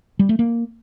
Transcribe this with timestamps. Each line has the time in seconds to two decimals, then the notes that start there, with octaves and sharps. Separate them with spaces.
0.19 G3
0.29 A3
0.39 A#3